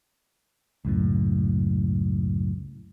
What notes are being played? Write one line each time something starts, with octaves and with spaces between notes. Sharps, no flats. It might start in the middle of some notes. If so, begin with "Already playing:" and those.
C#2 F#2 A2